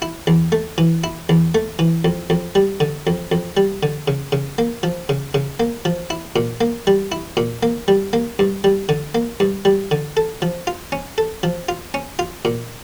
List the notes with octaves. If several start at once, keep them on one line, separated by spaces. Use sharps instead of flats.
E4
E2
A3
E3
E4
E2
A3
E3
F2
F2
G3
D3
F2
F2
G3
D3
C#3
C#3
A#3
F3
C#3
C#3
A#3
F3
E4
A#2
A#3
G3
E4
A#2
A#3
G3
A#3
G2
G3
D3
A#3
G2
G3
D3
A4
F3
F4
C#4
A4
F3
F4
C#4
F4
A#2